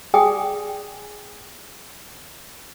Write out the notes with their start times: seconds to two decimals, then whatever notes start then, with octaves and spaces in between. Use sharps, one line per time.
0.14 G#4 D5 G5 G#5 D#6